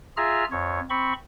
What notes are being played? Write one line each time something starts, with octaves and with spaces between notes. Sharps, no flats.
F4 G#4 E5 A#5 F6
F2 C#5
C4 B5 C#6